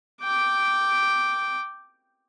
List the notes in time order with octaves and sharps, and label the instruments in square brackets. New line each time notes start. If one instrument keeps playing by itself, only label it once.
[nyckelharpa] G5 D6